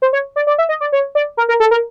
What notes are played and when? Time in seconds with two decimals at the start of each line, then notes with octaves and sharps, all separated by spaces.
0.02 C5
0.13 C#5
0.36 D5
0.47 D5
0.58 E5
0.69 D#5
0.81 D5
0.92 C#5
1.15 D5
1.37 A#4
1.49 A#4
1.60 A4
1.71 A#4